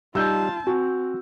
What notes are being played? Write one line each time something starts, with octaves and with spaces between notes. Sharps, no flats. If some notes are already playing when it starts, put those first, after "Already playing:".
G3 D#4 F4 A5 E6 G6
C4 F#4 G#5